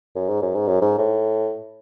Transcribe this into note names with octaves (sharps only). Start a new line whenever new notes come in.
F#2
G#2
F#2
G#2
F#2
G#2
A2